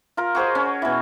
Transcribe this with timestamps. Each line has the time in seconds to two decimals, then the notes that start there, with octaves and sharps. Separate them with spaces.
0.17 F4 A#4
0.35 F#4 G#4 C5 D#5
0.55 C#4
0.82 B2 E3